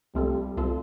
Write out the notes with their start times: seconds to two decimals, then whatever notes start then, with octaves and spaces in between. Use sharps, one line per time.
0.15 C2 C3 G3 A3 F4 A4
0.57 C2 C3 A3 F4 A4